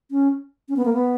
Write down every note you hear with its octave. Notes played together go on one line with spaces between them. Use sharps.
C#4
C#4
B3
A#3
B3